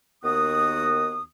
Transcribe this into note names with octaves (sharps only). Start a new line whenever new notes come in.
D#2 D#3 B3 F#4 D#6